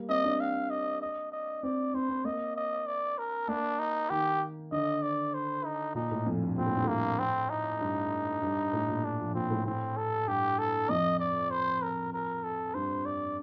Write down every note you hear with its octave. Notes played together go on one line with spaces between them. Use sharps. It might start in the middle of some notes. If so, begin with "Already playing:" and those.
Already playing: G3 A#3
C4 D#5
D4
F5
D#5
D#5
D#5
C4 D5
C4 C5
C4
A#3 D#5
D#5
D5
A#4
A#3 D4
D#4
D#3 G4
D3 D#5
D5
C5
D#4
A#2 D#4
A2
F2
G2
A#2 C4
A2
G2
A2 A#3
C4
D#4
G2
G2
A2
A#2
D4
F3
A#2 C4
A2
A2 C4
A4
G2 G4
A4
F2 D#5
D5
C5
A#4
A#4
A4
G2 C5
D5